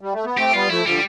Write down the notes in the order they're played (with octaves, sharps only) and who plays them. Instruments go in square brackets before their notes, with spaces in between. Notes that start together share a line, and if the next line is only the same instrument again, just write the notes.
[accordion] G3
A3
B3
[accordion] A3 C4 [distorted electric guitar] G4
[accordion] G3 B3 [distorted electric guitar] F4
[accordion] F3 A3 [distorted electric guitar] E4
[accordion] D3 F3 [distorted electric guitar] G3